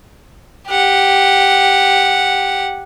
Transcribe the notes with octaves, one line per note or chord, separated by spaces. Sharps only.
G4 F#5